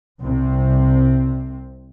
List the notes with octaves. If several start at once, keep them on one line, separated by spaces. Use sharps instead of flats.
C2 C3 C4